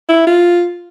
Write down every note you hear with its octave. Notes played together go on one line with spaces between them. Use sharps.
E4
F4